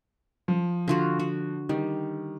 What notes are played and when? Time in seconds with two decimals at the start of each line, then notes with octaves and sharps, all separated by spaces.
0.48 F3
0.88 D3 F4 F#4
1.19 F#4
1.69 D#3 G3